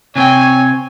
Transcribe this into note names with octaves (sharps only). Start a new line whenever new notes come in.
C3 C4 C#5 G5 G#5